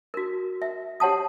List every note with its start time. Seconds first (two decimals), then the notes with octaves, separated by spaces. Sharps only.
0.14 F#4 A#4
0.62 E5
1.00 G4 C#5 F#5 A5 D#6